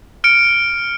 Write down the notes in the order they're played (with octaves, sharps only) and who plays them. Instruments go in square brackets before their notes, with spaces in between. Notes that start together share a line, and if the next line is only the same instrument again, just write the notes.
[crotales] F6 C#7 D7